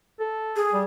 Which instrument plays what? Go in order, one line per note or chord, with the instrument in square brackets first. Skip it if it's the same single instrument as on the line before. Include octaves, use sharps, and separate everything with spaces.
[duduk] A4
[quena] G#4
[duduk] G3